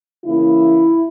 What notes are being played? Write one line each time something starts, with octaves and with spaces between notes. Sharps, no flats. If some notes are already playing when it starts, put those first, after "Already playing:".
C#3 E3 A#3 E4